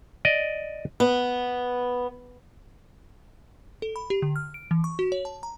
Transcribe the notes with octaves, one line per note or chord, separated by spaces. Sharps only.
D5 D#5
B3
A4
B5
G4
D3
F6
D7
E3
C#6
F#4
C#5
A5
A#5